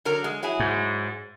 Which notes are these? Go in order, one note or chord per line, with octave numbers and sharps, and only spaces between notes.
D3 F#3 A#4
G#3
F#3 E4 G#4
G#2